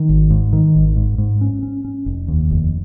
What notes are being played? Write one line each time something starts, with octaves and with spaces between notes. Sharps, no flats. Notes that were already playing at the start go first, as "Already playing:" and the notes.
Already playing: D#3
G#1
G#2
D#3
G#1
G#2
G#2
C#4
C#4
C#4
F1
D#2
F1